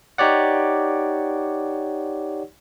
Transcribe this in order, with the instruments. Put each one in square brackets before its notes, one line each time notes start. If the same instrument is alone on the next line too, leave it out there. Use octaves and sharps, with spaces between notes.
[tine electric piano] D#4 G4 C#5 D5 F#5